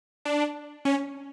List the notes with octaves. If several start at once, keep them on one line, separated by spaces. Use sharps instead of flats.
D4
C#4